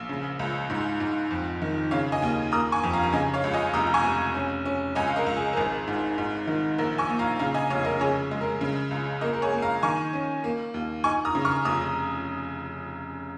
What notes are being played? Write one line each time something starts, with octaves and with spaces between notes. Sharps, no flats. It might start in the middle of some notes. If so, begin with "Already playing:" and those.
Already playing: A#1 F5
C#3
C#2
G#2
G#2
F2
D#3
C#3 C#5 F5
D#5 G#5
D#2
A#3 A#5 D#6
G#5 C#6
F2
F5 A#5
A#5
C#3 D#5 G#5
C#5 F5
C#2
D#5 G#5
F1 A#5 D#6
A#5
G#5 C#6
F1
C#4
C#4
C#2 D#5 G#5
F5
A#4 D#5
C#2
G#4
A#4
G#1 G#4
G#2
G#2
D#3
A#1 A#4
G#5 C#6
A#2
F5 A#5
C#3 F5 A#5
D#5 G#5
F1 C#5 F5
A#4 D#5
C#3 G#4 C#5
G#3
A#4
C#3
C#2
A#3 A#4 D#5
A#4
G#4 C#5
A#3
F5 A#5
D#3 G#5 C#6
C#4
A#3
D#2
D#4 G#5 C#6
A#5 D#6
C#3
C#6 F6
F1 A#5 D#6